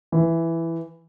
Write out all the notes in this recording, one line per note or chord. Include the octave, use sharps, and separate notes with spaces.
E3